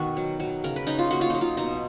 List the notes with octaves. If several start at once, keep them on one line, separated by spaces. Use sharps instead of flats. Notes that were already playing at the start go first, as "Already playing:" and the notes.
Already playing: B2 D#3 B3 F#4
F#3
F#3
C#3 A#4
B4
C#4 D#4
F4
A#3 F#4
F4
F#3 D#4
F4
B2 D#4